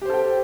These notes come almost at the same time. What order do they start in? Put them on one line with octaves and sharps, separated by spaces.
G4 C5 A4 G5